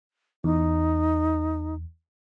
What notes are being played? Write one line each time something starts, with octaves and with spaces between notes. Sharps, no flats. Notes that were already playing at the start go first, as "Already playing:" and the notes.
E2 D#4